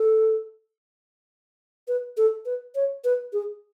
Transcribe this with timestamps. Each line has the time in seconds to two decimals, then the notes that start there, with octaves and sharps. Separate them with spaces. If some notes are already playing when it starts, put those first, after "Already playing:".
Already playing: A4
1.88 B4
2.17 A4
2.46 B4
2.75 C#5
3.04 B4
3.33 G#4